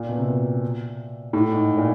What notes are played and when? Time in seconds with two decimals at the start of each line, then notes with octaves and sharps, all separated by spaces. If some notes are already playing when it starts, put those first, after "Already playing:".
Already playing: A#2
0.09 B2
0.18 C3
0.27 B2
1.33 A2
1.52 G#2
1.77 A#2